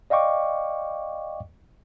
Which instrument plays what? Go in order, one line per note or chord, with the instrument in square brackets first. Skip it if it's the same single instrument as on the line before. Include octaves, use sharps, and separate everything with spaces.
[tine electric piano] D5 D#5 F5 G5 C#6 D6